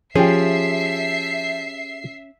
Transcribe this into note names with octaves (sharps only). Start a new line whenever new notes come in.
F3 C#4 G4 G#4 E5 C7